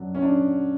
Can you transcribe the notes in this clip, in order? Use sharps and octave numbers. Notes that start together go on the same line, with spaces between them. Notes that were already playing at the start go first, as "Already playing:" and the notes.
Already playing: F#2 D3 F#3 D4
C#4
D4